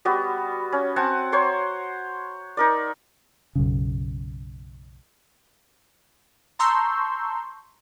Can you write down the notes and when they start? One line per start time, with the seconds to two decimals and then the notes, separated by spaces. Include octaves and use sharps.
0.05 G3 B3 F#4
0.72 C#4
0.96 C4 F#5 G#5 A5
1.32 C5 C#5 A#5 C6
2.57 D#4 A#4 D5
3.55 B1 F#2 C#3
6.59 A5 A#5 C6 C#6 E6 G6